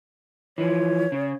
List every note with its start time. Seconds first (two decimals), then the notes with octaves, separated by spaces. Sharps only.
0.58 E3 F3 C#5
1.12 C#3